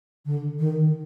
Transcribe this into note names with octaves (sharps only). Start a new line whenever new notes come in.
D3
D#3